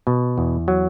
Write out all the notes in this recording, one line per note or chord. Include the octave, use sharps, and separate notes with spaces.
B2
E2
F#3